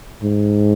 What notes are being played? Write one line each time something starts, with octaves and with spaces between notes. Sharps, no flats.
G#2